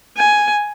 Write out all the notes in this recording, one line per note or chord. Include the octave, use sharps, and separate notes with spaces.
G#5